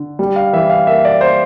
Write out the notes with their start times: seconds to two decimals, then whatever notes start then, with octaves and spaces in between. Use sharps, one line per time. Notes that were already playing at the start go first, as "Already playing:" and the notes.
Already playing: D3
0.19 G3
0.36 F5
0.53 E3 E5
0.70 F5
0.87 A#3 E5
1.05 D5
1.21 C5